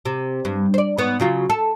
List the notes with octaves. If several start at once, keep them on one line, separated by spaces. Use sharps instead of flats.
C3
G2
C5 D5
G#2 B3 C#5
C#3 F#3 F4
A4